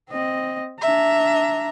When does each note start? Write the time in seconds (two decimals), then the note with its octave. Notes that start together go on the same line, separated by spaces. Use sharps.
0.10 C4 D#5
0.81 D4 E5 A#5